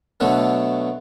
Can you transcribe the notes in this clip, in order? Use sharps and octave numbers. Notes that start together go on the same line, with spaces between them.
B2 D3 F#3 A3